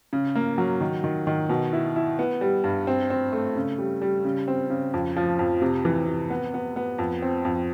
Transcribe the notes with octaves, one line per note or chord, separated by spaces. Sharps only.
C#3
A#3
F#3
D#3
D#3
D#3
B2
E4
E4
B3
G3
G2
C4
C4
A3
C#3
G3
G3
C#3
C4
C#3
F2
F3
F2
C3
E3
C3
B3
B3
B3
F2
C4
F2